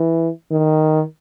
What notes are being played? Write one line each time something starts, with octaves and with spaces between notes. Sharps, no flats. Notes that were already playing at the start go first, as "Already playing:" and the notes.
Already playing: E3
D#3